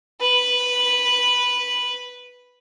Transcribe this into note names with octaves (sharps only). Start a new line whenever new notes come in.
B4